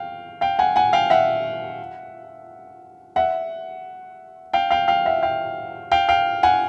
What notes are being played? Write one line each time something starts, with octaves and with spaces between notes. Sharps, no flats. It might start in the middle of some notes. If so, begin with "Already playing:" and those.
Already playing: F5 G5
F5 G5
F#5 G#5
F#5 G#5
F5 G5
E5 F#5
E5 F#5
F5 G5
F5 G5
F5 G5
E5 F#5
F5 G5
F5 G5
F5 G5
F#5 G#5